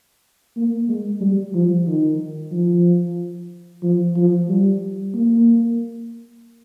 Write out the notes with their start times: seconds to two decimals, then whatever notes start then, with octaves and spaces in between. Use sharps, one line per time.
0.56 A#3
0.89 G#3
1.21 G3
1.54 F3
1.87 D#3
2.52 F3
3.83 F3
4.16 F3
4.48 G3
5.14 A#3